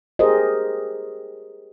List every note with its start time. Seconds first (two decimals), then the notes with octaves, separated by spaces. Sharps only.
0.19 G4 G#4 A#4 C5 D#5